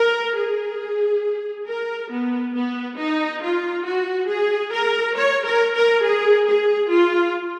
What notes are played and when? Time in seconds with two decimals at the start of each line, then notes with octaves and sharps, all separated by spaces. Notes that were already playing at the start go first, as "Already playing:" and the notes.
Already playing: A#4
0.36 G#4
1.66 A#4
2.10 B3
2.54 B3
2.97 D#4
3.41 F4
3.85 F#4
4.28 G#4
4.72 A#4
5.15 C#5
5.45 A#4
5.74 A#4
6.03 G#4
6.47 G#4
6.90 F4